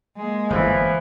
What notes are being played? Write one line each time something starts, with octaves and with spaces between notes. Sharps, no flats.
G#3 A#3
G1 F#2 E3 F3